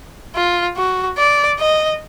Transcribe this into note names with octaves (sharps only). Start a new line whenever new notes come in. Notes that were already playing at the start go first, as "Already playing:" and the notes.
F4
F#4
D5
D#5